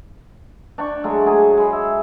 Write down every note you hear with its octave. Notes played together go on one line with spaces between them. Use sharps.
D4 D5 G5 C#6
F#3 G#3 A3
F#3 G#4 G#5 C#6
G#3 B5
E5